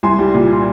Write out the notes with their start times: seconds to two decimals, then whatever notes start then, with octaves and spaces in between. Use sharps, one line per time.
0.03 C2 G#5 C6
0.19 G3
0.34 A#2